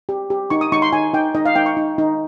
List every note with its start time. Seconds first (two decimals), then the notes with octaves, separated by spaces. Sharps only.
0.09 G4
0.30 G4
0.50 D#4 C#6
0.61 D#6
0.72 D#4 C#6
0.82 C6
0.92 D#4 G#5
1.14 D#4 G5
1.35 D#4 D#5
1.45 F5
1.56 D#4 G5
1.66 C#6
1.77 D#4
1.98 D#4